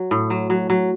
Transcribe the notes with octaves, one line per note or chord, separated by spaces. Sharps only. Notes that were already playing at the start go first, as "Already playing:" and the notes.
Already playing: F#3
A2
F#3
F#3
F#3